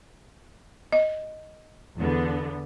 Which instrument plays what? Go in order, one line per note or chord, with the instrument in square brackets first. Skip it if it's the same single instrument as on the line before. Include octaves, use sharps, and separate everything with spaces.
[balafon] D#5
[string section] E2 D3 B3